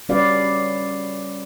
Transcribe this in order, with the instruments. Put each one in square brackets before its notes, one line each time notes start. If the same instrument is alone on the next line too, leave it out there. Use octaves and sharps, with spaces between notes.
[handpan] G3 C#4 F#4 B4 D5 F5